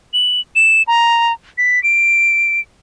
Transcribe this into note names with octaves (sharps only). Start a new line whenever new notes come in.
F#7
E7
A#5
B6
D7